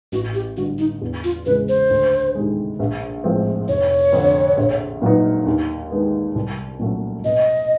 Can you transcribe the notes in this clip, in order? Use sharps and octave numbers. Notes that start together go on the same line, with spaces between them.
A1 F#4
G4
G2 D3 F#4
D#4
E2
F4
C#3 E3 G#3 B4
C5
D2
C3 D#3 G#3
A#1
A2 F3 G#3 C4
F1 C#5
F2 D3
A#1
A#2 F#3 B3 D#4
D#2
D#3 G#3 B3
C2
A#2 F#3 A3 C#4
B2 D#5